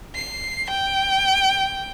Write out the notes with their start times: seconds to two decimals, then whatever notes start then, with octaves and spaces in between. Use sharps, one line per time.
0.15 C7
0.70 G5